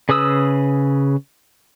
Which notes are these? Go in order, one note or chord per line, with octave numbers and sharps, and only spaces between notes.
C#3 G#4 B4 D#6 E6